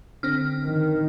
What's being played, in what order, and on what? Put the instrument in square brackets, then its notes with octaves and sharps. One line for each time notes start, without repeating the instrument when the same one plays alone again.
[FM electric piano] D3 C4 A#6 [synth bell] F6
[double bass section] D#3